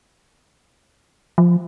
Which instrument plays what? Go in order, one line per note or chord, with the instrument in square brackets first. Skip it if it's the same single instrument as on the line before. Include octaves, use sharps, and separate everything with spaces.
[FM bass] F3